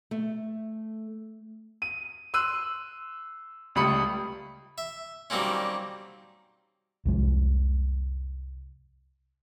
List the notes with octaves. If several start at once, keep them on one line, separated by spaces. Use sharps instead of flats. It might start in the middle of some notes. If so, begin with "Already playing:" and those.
A3
D#7
C6 E6 F#6 D#7
C#2 G3 A3 B5 D#6 C#7
E5
D#3 F#3 G3 A#3 C4 C#4
C2 F2 G#3